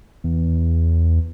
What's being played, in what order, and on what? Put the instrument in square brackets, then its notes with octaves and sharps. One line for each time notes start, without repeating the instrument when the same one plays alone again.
[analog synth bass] E2